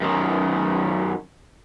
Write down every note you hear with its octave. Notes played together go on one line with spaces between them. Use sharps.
F#2 D#3